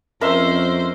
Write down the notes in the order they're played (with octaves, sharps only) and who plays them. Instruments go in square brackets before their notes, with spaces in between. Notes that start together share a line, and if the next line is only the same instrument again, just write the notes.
[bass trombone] F2 [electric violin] C#4 C5 [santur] A#4 E5 E6